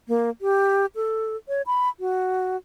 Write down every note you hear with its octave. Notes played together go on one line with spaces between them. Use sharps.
A#3
G4
A4
C#5
B5
F#4